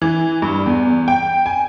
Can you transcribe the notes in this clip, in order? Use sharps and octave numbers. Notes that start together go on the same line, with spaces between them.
E3
G2
E2
G5
G#5